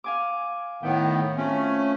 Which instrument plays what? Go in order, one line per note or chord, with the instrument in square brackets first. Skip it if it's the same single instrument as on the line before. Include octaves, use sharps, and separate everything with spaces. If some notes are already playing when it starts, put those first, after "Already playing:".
[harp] F5 G#5 D6
[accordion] A2 D#3 B3 [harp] E5 G5
[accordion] A3 C#4 [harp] C4 F4